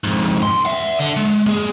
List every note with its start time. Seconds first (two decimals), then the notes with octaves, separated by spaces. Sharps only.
0.04 F2 G#2
0.43 C#2 C6
0.65 E5 F#5
0.99 D3
1.17 G#3
1.46 A#3 G#4